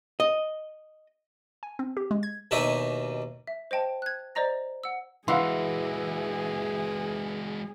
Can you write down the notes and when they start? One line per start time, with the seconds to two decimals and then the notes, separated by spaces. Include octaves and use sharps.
0.20 D#5
1.63 G#5
1.79 C4
1.97 G4
2.11 G#3
2.23 G#6
2.51 D#2 B2 D4 D#4 E5 D#6
3.47 E5
3.71 C5 D#5 G5 A5
4.02 F#6 G#6
4.35 C5 D5 D#5 A#5 A#6
4.84 F#5 E6
5.28 E3 G#3 F#4 G#4 F5 F#5 C6